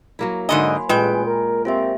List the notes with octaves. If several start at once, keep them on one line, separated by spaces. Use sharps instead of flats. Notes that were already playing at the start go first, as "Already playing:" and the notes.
F#3 A#3 E4
G#2 D3 D#5 G#5 B5 C6
A1 A#2 G#3 G#4 B4 G5
A#4
A#3 C4 F4 G4 E5